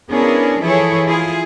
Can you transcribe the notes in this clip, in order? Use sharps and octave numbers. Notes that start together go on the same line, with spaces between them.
B3 C#4 D4 E4 G#4 A#4
E3 F3 E4 G#4 A4 C#5
E4 F4 G#4